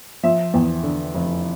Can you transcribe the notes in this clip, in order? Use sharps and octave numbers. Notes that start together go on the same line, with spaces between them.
F3 E5
E2
D3
F1